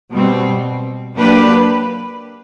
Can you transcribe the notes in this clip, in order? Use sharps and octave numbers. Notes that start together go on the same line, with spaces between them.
B2 G3 C4
F#3 A#3 D4 G4 B4